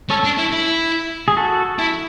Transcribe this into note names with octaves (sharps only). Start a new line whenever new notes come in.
C#4 A4 C#5
D4
E4
E4
G#4
F#4 A4
E4